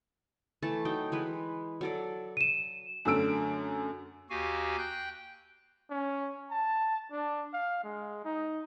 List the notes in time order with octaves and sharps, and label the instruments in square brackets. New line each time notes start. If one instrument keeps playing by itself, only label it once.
[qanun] E3 A3 A5
F#3 D#4 G5
E3 G#3 B4
F#3 A4 D5
[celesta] D#7 E7
[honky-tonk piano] F#2 D3 A3 E6 D7
[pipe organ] D#2 F#4 G4 F5 G#5
G5 F#6 G6
[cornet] C#4
A5
D4
F5
G#3
D#4